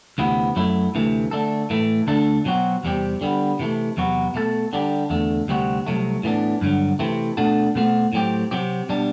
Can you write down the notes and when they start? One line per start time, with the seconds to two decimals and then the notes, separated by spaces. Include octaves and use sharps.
0.18 D2 C3 E3 B3
0.56 F#2 F#3 A3 E4
0.95 D2 C3 E3 A3
1.31 D3 A3 D4 A4
1.70 A2 E3 A3
2.07 D2 D3 A3 D4 A4
2.45 B2 F#3 C4 F#4
2.84 E2 C3 G3 C4 G4
3.21 D3 G3 B3
3.59 C3 E3 A3
3.97 E2 C3 F#3 B3 F#4
4.34 B2 A3 E4 A4
4.73 D3 G3 D4 G4
5.10 E2 D3 A3
5.48 D2 C3 G3 C4 F#4
5.86 C2 C3 F#3 A3
6.23 A2 E3 B3 D4
6.61 G2 D3 F#3
6.99 C3 E3 A3 C4
7.37 B2 A3 D4 F#4 A4
7.75 B2 A3 C4 F#4
8.13 A2 F#3 C4 G4
8.51 C3 F#3 C4 G4
8.89 B2 G3 D4